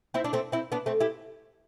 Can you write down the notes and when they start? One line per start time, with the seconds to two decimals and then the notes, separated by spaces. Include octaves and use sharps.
0.14 C4 E4
0.24 D4
0.33 A3 C4
0.52 C4 E4
0.72 B3 D4
0.86 A3 C4
1.00 E4 G4